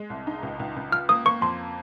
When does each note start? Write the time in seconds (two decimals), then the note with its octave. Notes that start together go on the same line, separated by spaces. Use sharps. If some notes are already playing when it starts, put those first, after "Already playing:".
Already playing: G#3
0.10 C2
0.27 D#4
0.43 C#2
0.60 C#2
0.76 C#2
0.92 F4 F6
1.09 A#3 D#6
1.25 A#3 C#6
1.41 F2 C6